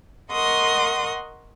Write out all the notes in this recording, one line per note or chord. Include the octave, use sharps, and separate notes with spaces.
A#4 D#5 F#5 C6 C#6 D#6